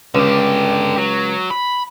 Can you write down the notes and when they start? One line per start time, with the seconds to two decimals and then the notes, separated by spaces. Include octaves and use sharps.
0.15 C#2 D3 G4
0.97 F#3
1.51 B5